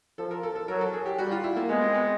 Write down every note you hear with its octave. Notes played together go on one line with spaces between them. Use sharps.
F3 A4
A#4
A4
A4
F#3 A#4
A4
G#4
G4
G3 F#4
F4
E4
A#3
G#3 B3
C4
B3